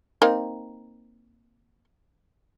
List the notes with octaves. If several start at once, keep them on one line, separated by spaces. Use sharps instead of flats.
A#3 C4 D#4